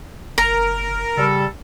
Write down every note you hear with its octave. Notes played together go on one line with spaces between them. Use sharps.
F#1 A#4 A#5
C#3 G3 A4